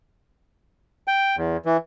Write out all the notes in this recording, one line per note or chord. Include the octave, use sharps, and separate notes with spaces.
G5
E2
E3